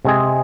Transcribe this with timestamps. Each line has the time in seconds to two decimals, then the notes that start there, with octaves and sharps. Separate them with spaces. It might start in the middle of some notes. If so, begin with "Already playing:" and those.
0.05 C3 G#3 C4 G#4